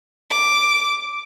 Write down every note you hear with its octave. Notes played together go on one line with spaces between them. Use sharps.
D6